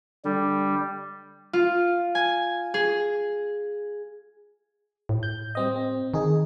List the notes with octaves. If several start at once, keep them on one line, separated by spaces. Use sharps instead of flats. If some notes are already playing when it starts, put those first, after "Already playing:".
D3 G3
F4
G#5
G#4
A2
G6
G3 C4 D#5
C4
D#3 D#4 G#4